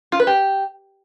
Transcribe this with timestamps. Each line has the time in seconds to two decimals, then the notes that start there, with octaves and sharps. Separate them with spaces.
0.12 F4
0.20 B4
0.27 G4